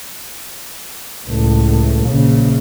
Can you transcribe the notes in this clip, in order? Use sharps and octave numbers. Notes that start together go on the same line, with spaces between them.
C#2 A2
A#1 C#3